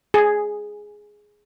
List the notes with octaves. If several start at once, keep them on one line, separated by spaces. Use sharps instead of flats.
G#4